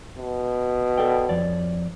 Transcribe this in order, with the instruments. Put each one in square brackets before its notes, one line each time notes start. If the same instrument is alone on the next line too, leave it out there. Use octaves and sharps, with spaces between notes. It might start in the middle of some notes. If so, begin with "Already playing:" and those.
[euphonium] B2
[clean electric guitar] A4 D5 G5
F2 C#5 D5